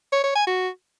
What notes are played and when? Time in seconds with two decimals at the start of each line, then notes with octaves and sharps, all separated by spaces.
0.12 C#5
0.24 C#5
0.35 G#5
0.47 F#4